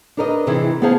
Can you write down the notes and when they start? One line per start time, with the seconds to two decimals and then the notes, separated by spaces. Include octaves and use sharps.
0.17 D4 D#4 A#4 B4 D5 D#5
0.47 C3 D#3 E3 D#4 E4 G#4
0.82 B3 C#4 G#4 C5 F5 A5